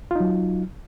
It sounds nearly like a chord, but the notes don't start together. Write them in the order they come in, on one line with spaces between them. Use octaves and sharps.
F4 D#4 F#3